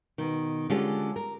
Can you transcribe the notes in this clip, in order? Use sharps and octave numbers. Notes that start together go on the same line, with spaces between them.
B2 D#3
D3 G#3 C#4 D4 F4 G4
A#4